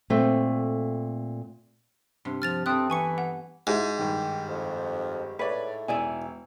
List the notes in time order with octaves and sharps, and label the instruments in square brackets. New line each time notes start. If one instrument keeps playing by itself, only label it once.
[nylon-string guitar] A#2 A3 C4
[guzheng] G2 C3
[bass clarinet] F3 [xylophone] F6 A6 F7
[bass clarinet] C4 [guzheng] A4 B4 E5 [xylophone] G5 D#6 F#6
[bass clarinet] E3 [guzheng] B3 [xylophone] G#5 C#6 C#7
[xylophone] F#5
[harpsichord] G#2 [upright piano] E4 F#4 G#5
[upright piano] G2 D#3 [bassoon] G4
[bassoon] F2
[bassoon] A2 [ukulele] B4 [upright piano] C#5 D5
[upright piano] E1 [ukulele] E4 D5 G#5